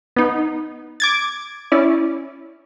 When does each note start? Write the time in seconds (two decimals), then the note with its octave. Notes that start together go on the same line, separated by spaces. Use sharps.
0.16 B3 D#4
1.00 D6 G#6 A6
1.72 C#4 E4 D5